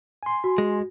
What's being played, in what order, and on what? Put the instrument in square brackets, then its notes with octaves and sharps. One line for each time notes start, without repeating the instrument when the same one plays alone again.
[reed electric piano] G#5 C6
[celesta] F#4
[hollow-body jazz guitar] G#3